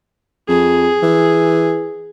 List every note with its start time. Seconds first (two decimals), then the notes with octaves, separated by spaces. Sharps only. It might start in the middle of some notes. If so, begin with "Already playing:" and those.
0.48 F2 G#4
1.03 E3